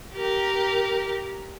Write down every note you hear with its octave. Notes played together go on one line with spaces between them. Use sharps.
G4 A#4